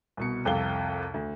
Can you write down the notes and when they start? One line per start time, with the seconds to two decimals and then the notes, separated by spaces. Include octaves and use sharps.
0.17 C2 B2 C#7
0.45 C2 F2 C3 A4 F5 G7
1.14 D2